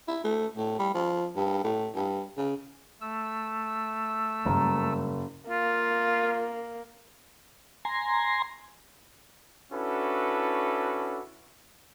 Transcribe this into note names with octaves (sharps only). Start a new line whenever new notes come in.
E4
A3
A2
G3
F3
G2
A2
G2
C#3
A3 E6
F#1 G2 D3 A#4
A#3 F4
G#5 A#5 C6
C#4 D4 E4 F#4 A4 B4